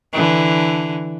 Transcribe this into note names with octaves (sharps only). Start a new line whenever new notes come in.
D3 E3